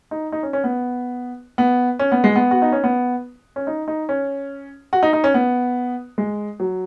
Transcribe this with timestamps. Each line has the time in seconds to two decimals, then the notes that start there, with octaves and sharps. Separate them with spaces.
0.11 D#4
0.32 D#4
0.43 C#4
0.53 C#4
0.64 B3
1.58 B3
1.99 C#4
2.12 B3
2.24 G#3
2.36 B3
2.51 F#4
2.62 D#4
2.72 C#4
2.84 B3
3.56 C#4
3.67 D#4
3.88 D#4
4.09 C#4
4.93 F#4
5.03 D#4
5.13 D#4
5.24 C#4
5.34 B3
6.18 G#3
6.60 F#3